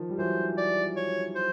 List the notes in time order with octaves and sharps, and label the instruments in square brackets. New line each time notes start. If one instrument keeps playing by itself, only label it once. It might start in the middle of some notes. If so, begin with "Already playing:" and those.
Already playing: [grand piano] D#3 F3
G3
[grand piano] E3 F#3 [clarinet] C5
[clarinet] D5
C#5
C5